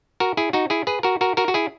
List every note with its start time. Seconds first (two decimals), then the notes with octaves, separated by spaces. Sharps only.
0.20 F#4 A#4
0.37 E4 G#4
0.53 D#4 F#4
0.70 E4 G#4
0.87 G#4 B4
1.03 F#4 A#4
1.21 F#4 A#4
1.37 F#4 A#4
1.48 F#4
1.54 E4 G#4